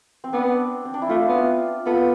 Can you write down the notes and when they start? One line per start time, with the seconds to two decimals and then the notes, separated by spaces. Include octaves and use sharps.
0.24 C4
0.33 B3 D4
0.85 C4
0.94 D4
1.02 E4
1.09 A3 D4 F4
1.29 B3
1.86 B3 F4 A4